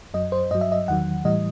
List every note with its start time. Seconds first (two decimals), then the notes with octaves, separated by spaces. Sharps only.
0.14 F#2 F#3 D#5
0.32 C5
0.51 G2 F#3 D#5
0.61 E5
0.72 D#5
0.88 E2 D#3 F#3 F#5
1.25 A2 E3 G3 D#5